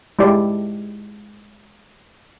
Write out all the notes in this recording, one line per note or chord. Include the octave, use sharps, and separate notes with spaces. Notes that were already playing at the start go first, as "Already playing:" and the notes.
G#3 E4 G4 D5